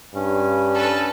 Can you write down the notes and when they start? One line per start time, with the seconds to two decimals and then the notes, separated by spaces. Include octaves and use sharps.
0.14 G2 C#4
0.75 A4 B4